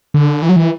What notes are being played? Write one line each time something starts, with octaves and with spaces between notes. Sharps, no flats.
D3
E3
F#3
E3